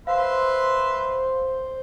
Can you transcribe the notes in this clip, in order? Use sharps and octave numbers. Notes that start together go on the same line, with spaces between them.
B4 C5 E5 F5 C6